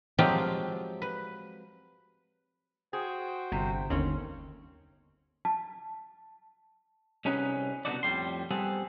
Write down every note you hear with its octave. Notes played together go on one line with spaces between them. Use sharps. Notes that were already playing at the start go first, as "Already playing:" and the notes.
F3 F#3 G#3 C4 F4 G4
B4
F#4 G#4 C5 G5
G1 C3
G1 D#2 C4 C#4
A5
C2 C#4 D#4 G#4 B4
C2 B2 D3 D#4 F#4 D5
F2 A2 G3 C6
G3 B3 C4 G#4 A4